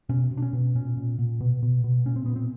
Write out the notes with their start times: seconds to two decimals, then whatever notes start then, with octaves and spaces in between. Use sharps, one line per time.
0.09 B2 C#4
0.31 B2
0.37 D4
0.42 C#4
0.53 B2
0.75 A#2 C#4
0.97 A#2
1.19 A#2
1.41 B2
1.63 B2
1.84 B2
2.06 A#2 C#4
2.16 C4
2.26 A#2 B3
2.36 C4